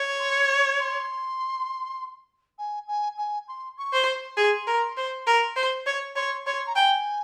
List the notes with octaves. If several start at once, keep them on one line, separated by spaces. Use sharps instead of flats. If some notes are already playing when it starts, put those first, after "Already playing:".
Already playing: C#5
C6
C#6
C6
G#5
G#5
G#5
C6
C#6
C5
C6
G#4
A#4
C5
A#4
C5
C#5
C#5 C6
C#5 C6
A#5
G5 G#5